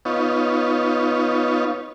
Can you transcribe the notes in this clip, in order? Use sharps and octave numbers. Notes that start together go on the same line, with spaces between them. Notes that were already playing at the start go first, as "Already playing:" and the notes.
B3 D#4 F4 C#5